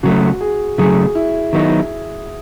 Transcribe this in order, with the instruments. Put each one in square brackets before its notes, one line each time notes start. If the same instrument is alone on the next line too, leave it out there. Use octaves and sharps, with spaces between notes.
[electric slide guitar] C#3 F#3 A3 [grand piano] F#4
[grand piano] G#4
[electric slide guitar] C#3 F#3 A3 [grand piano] G#4
[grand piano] E4
[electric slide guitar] D#3 F#3 B3 D#4